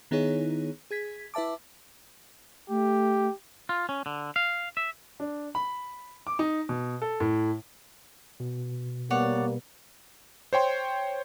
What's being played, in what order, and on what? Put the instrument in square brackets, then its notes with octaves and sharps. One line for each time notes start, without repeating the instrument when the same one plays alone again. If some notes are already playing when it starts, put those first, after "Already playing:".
[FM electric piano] D#3 B3 D#4 E4 G#4 C#5
G#4 G#6 B6
E4 B4 E5 A5 D6
[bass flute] A3 [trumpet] G4
[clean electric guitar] F4
C#4
D3
F5
E5
[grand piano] D4
B5
D6
D#4
B2
A4
A2
[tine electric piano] B2
[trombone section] G3 A#3 B3 [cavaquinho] C#5 D5 F#5
[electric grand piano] C5 C#5 G5 C6